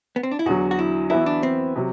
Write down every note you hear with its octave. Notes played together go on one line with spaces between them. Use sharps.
B3
C4
D4
E4
E2 D3 F#3 F#4
F#4
E4
E3 B3 E4 F#4 B4 E5
D4
C4
C3 F#3